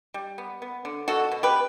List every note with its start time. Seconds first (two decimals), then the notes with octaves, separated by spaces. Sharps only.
0.14 G3
0.38 B3
0.62 B3
0.85 D3
1.08 B2 F#4 A4
1.32 B2
1.43 G4 B4